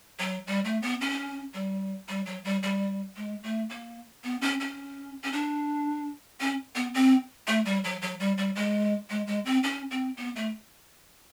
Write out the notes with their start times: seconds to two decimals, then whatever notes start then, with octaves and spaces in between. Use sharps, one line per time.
0.19 F#3
0.47 G3
0.65 A3
0.82 B3
1.01 C#4
1.54 G3
2.08 G3
2.26 F#3
2.44 G3
2.63 G3
3.16 G#3
3.43 A3
3.69 A#3
4.24 B3
4.41 C#4
4.60 C#4
5.24 C#4
5.32 D4
6.40 C#4
6.75 B3
6.94 C4
7.47 A3
7.65 G3
7.84 F#3
8.02 F#3
8.20 G3
8.38 G3
8.55 G#3
9.10 G#3
9.27 G#3
9.45 C4
9.63 C#4
9.91 C4
10.17 B3
10.36 A3